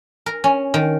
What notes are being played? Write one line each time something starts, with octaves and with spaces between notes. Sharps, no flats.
A#4
C#4
D#3